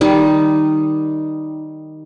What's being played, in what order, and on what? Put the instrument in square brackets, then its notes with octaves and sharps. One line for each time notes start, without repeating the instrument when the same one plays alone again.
[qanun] D#3 G3 D#4